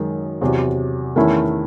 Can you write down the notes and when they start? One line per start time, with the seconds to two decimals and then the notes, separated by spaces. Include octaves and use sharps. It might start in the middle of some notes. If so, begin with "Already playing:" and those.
Already playing: F#2 D#3 G#3
0.41 E2 C3 F#3
1.16 E2 D#3 A3 C#4 E4